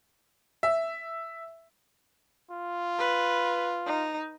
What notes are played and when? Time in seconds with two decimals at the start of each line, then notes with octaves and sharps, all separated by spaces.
0.63 E5
2.51 F4
2.99 B4
3.87 D#4